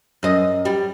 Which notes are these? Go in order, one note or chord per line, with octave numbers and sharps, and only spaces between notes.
F#2 D#5
G3